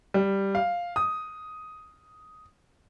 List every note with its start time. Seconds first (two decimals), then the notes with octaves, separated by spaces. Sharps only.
0.14 G3
0.55 F5
0.96 D#6